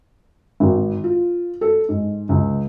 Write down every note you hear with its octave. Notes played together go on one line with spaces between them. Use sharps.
G#1
F4
A4
G#2
C#2